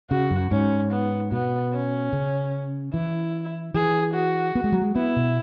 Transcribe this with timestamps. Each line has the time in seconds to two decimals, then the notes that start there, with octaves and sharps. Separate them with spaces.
0.11 C#3 F#4
0.31 F#2
0.51 G#2 C#4
0.92 B3
1.32 B2 B3
1.73 C#4
2.13 C#3
2.94 E3 E4
3.74 E3 G#4
4.14 F#4
4.55 B3
4.64 G#3
4.72 F#3
4.82 G#3
4.96 B3 E4
5.16 B2